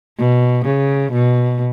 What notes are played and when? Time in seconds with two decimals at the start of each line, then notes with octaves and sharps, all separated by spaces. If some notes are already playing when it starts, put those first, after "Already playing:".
0.18 B2
0.65 C#3
1.12 B2